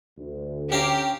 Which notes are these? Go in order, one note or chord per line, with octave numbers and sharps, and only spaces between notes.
D2
C#4 G4 F5 A#5